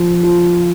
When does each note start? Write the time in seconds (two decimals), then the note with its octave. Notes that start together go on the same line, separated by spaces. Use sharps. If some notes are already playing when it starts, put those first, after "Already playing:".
Already playing: F3 F4
0.23 F4